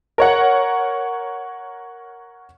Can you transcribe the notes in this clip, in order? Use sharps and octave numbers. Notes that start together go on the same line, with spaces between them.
A#4 C#5 F#5